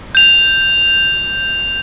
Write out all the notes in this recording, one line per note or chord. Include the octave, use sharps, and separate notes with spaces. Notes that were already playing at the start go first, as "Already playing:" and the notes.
G6 F7